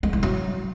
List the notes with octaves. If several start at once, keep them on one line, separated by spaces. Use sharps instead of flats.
G#3
E3
F#3